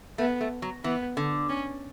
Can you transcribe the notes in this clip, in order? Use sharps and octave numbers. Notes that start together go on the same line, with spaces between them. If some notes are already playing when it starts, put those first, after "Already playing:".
A3 B3
A3
F#3
E3 B3
D3
C#4